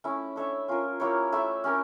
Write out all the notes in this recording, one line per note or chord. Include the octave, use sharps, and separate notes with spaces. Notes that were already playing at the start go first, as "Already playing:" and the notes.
A3 C#4 E4
D4 A4 C#5 E5
C#4 F4 A#4
A#3 E4 G4 C#5
A3 E4 A4 E5
C#4 G4 A#4